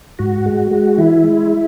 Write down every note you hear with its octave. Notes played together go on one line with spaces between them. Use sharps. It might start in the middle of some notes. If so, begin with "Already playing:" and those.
G#2 F#4
G#3
G#3
E3 E4
G#3